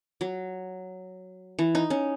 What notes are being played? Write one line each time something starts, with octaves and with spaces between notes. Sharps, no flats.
F#3
E3
D#4
C#4